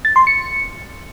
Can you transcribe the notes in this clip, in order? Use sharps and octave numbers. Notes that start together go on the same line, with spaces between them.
A6
C6
C#7